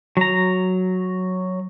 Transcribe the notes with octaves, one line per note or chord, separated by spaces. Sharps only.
F#3 A#5